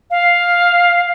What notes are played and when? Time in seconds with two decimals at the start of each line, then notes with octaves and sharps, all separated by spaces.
0.11 F5